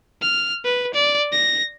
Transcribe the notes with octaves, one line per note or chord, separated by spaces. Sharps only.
F6
B4
D5
A#6